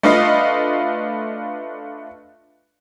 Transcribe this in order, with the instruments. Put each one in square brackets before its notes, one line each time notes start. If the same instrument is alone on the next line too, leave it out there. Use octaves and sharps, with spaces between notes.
[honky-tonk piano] A3 D4 F4 B4 D#5 F5